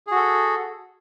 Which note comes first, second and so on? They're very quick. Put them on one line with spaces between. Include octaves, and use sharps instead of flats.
G#4 F#4 A4